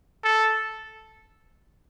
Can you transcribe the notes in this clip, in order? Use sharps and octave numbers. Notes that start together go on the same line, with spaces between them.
A4